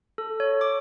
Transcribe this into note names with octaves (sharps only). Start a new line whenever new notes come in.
A4
C#5
D6